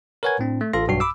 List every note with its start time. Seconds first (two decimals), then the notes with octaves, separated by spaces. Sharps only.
0.23 A#4 B4 C#5 F#5 G#5 G#6
0.39 A2 C4 D4
0.61 A3
0.73 A1 F4 A4 F5 C6 A#6
0.88 B1 G2 F#4 C7
1.00 B5 D6 E6